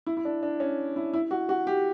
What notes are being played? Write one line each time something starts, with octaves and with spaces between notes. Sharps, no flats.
E4
E4
D4
D4
C#4
E4
E4
F#4
F#4
G4